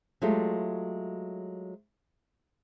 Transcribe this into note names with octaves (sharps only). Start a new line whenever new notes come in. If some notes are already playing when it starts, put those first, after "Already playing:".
F#3 G#3 A3 F4 G4